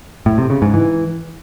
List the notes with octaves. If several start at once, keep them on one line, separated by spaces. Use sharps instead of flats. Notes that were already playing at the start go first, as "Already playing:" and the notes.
A2
C3
C#3
G#2
E3